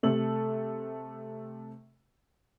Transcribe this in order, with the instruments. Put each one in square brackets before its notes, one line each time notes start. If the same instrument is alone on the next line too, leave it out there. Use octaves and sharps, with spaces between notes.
[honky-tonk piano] C3 A3 A4 F#7